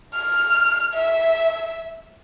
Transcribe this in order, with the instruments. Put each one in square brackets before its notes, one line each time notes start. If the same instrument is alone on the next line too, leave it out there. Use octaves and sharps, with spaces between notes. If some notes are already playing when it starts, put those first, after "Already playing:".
[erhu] F6
E5